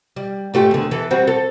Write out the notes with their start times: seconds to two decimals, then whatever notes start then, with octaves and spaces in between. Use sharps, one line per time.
0.16 G3
0.54 G#2 A3 G4
0.71 E2 D3
0.91 E3 A4
1.11 G3 C4 F#4
1.27 A4